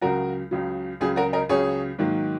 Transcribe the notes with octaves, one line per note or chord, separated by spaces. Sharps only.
C#2 C#3 F#3 F#4 A#4
C#2 C#3 F#3
C#2 C#3 F#3 G#4
F#4 A#4
A#4 D#5
C#2 C#3 F#3 G#4 C#5
G#2 D#3 F#3 A#3